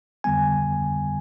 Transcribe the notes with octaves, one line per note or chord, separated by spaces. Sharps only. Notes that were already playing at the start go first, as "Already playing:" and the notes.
F2 D3 G3 B3 G#5